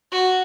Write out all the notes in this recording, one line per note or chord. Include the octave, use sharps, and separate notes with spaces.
F#4